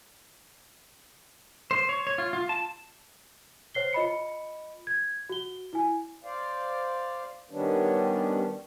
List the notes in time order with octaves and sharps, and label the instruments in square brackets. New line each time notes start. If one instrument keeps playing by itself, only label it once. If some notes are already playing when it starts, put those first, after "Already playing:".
[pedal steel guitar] C5
C#5
C#5
F4
F4
A5
[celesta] C5 C#5 C7 G7
F4 D#5 B5 C#7
G#6
F#4 G7
E4 G#5
[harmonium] C5 D5 F5
D#3 G3 B3 C#4 D4